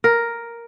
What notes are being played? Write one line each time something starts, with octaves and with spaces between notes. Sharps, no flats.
A#4